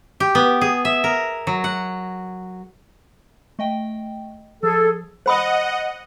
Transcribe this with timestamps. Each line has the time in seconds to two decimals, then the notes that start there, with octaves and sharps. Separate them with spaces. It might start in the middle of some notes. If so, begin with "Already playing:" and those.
0.20 G4
0.35 B3
0.61 G#4
0.85 E5
1.04 A#4
1.47 F#3
1.64 F#5
3.59 A3 D#5 G5
4.63 F3 G#4 A4
5.26 C5 D#5 F#5 B5 D#6